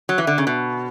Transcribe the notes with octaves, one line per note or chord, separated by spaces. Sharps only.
F#3
E3
D3
C#3
B2